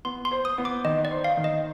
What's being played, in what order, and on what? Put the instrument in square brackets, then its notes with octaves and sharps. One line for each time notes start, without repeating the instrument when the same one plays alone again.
[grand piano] B3 [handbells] C6
[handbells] C6
[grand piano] C5
[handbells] D#6
[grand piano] B3
[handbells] D6
[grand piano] D#3 [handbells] D#5
[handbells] D5
[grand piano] C5
[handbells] F5
[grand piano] D#3
[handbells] D#5